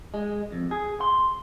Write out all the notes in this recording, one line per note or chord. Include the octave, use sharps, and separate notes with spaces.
G#3
F2
G#4
C6